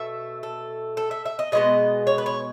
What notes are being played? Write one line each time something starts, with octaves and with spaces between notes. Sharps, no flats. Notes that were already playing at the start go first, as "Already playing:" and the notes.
Already playing: B2 A3 E5
A4
A4
E5
E5
D#5
B2 G#3 B3 D#5
C#5
B4
C#5